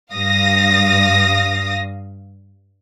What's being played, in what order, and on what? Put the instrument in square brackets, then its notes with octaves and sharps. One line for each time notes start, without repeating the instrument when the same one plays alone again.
[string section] G2 F5 D#6 A#6